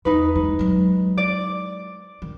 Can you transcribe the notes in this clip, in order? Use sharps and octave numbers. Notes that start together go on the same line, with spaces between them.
E2 D#4 B4
E3 G#3
F#3 G#3
D5
D#3